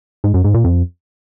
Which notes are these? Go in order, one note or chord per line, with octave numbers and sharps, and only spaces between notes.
G#2
F#2
G#2
A#2
F2